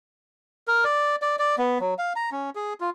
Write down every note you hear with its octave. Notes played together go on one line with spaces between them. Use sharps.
A#4
D5
D5
D5
B3
F#3
F5
A#5
C#4
G#4
F4